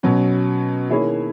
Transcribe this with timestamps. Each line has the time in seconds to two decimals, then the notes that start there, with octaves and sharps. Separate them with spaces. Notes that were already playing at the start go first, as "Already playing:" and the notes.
0.03 B2 F#3 C#4 F#4
0.89 D#3 A#3 E4 G#4 C#5